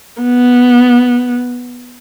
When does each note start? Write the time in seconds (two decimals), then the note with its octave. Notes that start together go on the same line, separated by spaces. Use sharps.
0.22 B3